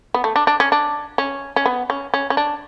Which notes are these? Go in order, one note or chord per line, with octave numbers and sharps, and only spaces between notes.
B3
A3
D4
D4
C#4
D4
C#4
C#4
B3
C#4
C#4
C#4
D4